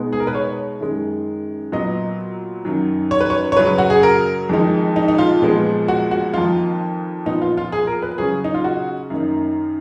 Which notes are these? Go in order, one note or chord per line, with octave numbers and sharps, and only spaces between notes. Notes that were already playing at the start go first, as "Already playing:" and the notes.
Already playing: B2 G#3 B3 D#4
G#4
A#4
B4
C#5
F#2 D#3 G#3
A#2 F#3 B3 D#5
F#2 D#3 F#3
C#5
B4
C#5
C#5
F#2 C#3 F#3 B4
F#4
G#4
A#4
F2 D#3 G#3 D#4
D#4
D#4
F4
A#2 F3 G#3 B3
F#4
F#4
F2 D#3 A#3 D#4 F4
A#2 F3 B3 D#4
F4
F4
G#4
A#4
B4
C#3 F#3 C#4 G#4
D#4
F4
F#4
F#2 D#3 A#3 D#4